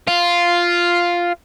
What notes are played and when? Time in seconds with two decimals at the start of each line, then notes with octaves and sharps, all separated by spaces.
0.07 F4